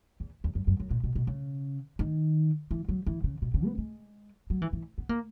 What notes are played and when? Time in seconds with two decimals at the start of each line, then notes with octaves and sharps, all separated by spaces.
0.20 E2
0.44 E2
0.55 F#2
0.67 F#2
0.80 F#2
0.91 A#2
1.04 B2
1.15 B2
1.27 C#3
1.99 D#3
2.71 E3
2.89 F#3
3.07 E3
3.24 C#3
3.42 B2
3.54 C#3
3.66 B3
3.78 G#3
4.50 F#3
4.62 E3
4.73 E3
4.98 B3
5.09 A#3